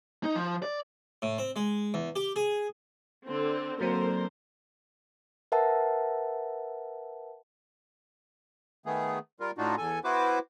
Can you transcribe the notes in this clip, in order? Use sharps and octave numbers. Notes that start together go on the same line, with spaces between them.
D#4
F3
D5
A2
C4
G#3
E2
G4
G#4
D3 C4
D3 F#3 A#3 C4 A#4 C5
A#4 B4 E5 F#5 A5
D#3 A3 B3 G#4
G3 F4 A#4
A2 D4 D#4 F4 F#4
E2 A4 G#5
B3 E4 F#4 B4 C5 D6